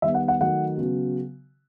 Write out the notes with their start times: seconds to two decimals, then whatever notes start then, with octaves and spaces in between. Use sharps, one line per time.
0.02 D#3 G3 B3 E5
0.14 F#5
0.28 F#5
0.40 D#3 F#3 A3 F#5
0.78 C#3 F#3 B3